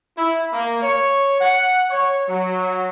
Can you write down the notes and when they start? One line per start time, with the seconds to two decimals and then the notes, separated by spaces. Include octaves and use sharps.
0.17 E4
0.53 A#3
0.82 C#5
1.40 F#5
1.91 C#5
2.28 F#3